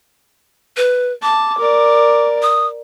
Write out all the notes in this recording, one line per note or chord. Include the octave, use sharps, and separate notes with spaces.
B4
A5 D6
A#4 D5
D#6